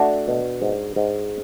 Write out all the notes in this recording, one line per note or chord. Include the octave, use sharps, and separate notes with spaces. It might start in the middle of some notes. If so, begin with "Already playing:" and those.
Already playing: A3 D4 F#4
B2
G#2
G#2